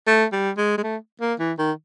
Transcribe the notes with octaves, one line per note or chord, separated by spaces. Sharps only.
A3
G3
G#3
G#3
A3
A#3
E3
D#3